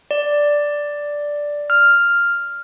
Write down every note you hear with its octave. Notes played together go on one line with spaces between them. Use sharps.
D5
F6